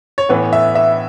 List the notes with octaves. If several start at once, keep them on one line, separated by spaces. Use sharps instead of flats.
C#5
A2 E3 B3 B4
E5
E5